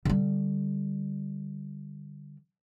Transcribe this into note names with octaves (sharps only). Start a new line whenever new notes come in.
D3 G3